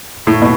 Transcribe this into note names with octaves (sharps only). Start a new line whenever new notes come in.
A2
B2